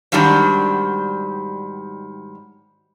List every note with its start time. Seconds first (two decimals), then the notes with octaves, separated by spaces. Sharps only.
0.12 G#2 D#3 F#3 G3 D4